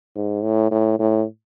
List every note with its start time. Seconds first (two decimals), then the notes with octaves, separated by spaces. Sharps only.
0.15 G#2
0.43 A2
0.71 A2
0.99 A2